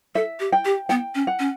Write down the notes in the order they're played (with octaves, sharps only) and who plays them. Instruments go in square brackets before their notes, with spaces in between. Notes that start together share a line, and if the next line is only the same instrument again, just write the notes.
[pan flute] A4 [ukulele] E5
[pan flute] G4
[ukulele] G5
[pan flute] G4
[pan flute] B3 [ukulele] G5
[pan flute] C#4
[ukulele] F#5
[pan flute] C#4